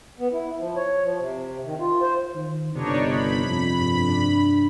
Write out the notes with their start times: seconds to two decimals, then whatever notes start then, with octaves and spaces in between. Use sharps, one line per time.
0.19 B3
0.33 E4
0.59 F3
0.76 C#5
1.03 F3
1.19 C3
1.64 D#3
1.80 F4
2.01 C5
2.35 D#3
2.75 G1 C3 B3 D4 D#4 C#5
3.06 G4 C5 E5 B5
3.45 F2
3.79 G2
4.08 D4